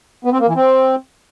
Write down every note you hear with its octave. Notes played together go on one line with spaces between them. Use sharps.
B3
C4
A#3
E3
C4